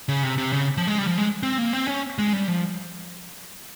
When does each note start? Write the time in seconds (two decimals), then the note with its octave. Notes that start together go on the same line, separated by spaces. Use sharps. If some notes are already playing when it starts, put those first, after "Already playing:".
0.09 C#3
0.23 C3
0.38 C3
0.53 C#3
0.77 F3
0.87 G#3
0.98 G3
1.07 F3
1.18 G#3
1.43 C4
1.58 A#3
1.73 C4
1.88 C#4
2.18 G#3
2.33 G3
2.48 F3